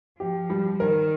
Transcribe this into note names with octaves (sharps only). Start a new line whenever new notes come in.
F3 G4
G3
D#3 A#4